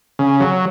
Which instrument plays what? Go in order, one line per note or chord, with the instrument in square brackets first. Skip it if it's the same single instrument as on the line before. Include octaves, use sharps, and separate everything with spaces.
[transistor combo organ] C#3
F#3